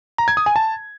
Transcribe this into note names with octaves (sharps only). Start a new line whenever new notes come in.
A#5
G#6
D#6
G#5
A5